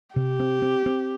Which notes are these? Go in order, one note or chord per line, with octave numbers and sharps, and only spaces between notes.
C3 G4
C4
C4
C4